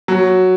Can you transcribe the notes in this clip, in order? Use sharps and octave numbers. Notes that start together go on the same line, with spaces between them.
F#3